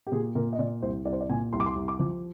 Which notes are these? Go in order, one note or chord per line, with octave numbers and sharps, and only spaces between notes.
G4
A#2 G#4
A#2 A#4
D#5
A#2 D5
C2 C5
C2 D5
C5
D5
A#2 G#5
C2 C6
D6
C6
C2
D6
F3